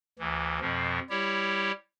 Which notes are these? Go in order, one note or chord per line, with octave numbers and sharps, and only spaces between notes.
D2 E3
F2 B2 F3
G3 E4 G4 C#5